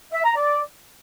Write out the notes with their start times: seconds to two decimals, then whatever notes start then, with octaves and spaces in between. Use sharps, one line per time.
0.13 E5
0.25 A#5
0.36 D5